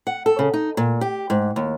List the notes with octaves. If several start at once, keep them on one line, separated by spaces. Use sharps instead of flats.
F#5
A4
C#3
D#4
A#2
G4
G#2
D#2